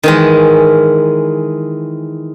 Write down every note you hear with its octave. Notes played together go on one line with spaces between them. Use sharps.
D#3 E3 G#3